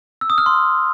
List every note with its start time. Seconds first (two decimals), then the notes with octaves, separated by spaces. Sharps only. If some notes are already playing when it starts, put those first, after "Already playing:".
0.21 E6
0.30 D#6
0.38 F6
0.46 C6